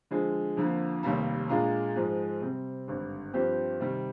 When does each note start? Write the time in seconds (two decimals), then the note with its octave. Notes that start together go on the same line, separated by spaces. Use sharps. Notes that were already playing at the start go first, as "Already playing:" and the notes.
0.11 D3 F3 G#3
0.57 F2 D3 F3 A#3
1.03 F1 D#2 D#3 G3 A#3
1.49 A#2 G#3 D4 F4 A#4
1.96 G#2 F3 G#3
2.41 C3 G3 C4
2.88 G#1 G2 D3
3.34 G2 F3 C4 G4 C5
3.80 C3 D#3 G3